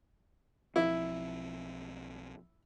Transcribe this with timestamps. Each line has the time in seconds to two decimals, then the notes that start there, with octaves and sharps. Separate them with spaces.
0.76 B1 F3 C4 E4